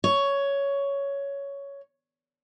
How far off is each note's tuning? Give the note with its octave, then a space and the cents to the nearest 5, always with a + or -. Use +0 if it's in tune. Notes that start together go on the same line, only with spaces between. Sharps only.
C#5 +10